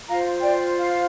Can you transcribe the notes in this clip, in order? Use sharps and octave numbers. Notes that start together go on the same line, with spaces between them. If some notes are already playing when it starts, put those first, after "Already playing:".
F4 C5 F5 A#5
D5 G5
F5